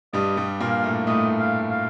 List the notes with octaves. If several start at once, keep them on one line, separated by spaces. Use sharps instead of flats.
G2 G3 D#5
G2 G3
A#2 A#3 F5
A2 A3
A2 A3 D#5
F5
F5